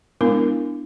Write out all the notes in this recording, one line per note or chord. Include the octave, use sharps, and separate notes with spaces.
G#3 B3 D4 E4 A#4